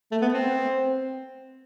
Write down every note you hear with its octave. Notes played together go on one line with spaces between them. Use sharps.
A3
B3
C4